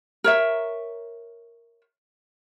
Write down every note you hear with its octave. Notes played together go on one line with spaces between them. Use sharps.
A#4 C#5 E5